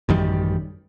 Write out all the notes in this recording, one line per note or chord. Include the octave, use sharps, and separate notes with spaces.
A1 F#2 D#3 G3